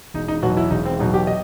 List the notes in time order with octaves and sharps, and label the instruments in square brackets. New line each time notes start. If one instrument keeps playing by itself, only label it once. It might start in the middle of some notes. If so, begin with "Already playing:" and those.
[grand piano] E1 D#4
D#4
E2 B2 F#3 F#4
E4
E1 D#4
C4
E2 B2 F#3 D#4
G4
D#5